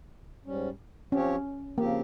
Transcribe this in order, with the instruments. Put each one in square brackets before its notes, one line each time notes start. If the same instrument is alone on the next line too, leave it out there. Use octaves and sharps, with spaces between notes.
[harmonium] G#2 G3 C#4
[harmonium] F3 C4 G4 C#5 [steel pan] C#4
[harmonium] C#3 F3 C4 G4 [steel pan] A#3